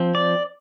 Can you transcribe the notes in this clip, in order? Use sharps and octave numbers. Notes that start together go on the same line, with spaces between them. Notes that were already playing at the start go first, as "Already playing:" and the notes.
Already playing: F3 C4
D5